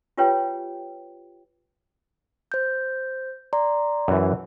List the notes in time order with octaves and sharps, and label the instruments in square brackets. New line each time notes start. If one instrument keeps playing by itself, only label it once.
[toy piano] F4 G4 B4 C#5 G5
[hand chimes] C5 G6
D5 A#5 C6
[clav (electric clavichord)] F#2 E3